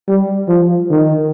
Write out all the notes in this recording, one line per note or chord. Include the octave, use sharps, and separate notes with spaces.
G3
F3
D#3